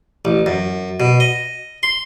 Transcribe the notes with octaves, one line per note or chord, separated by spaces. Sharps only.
A1
F#2
B2
D#5
C6